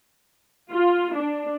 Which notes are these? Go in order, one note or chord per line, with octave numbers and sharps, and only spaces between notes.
F4
D4